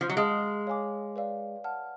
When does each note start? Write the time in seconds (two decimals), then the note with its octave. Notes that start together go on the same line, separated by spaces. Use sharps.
0.01 F3
0.09 F#3
0.16 G#3 F5 A5 F6
0.67 C#5 F5 G#5 D6
1.16 B4 D5 F5
1.64 F#5 A5 F6